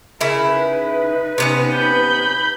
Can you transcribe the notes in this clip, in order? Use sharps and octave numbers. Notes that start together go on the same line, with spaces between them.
C#3 E4 A#4
D#4 B4
C3 B3 C#4
B5 G6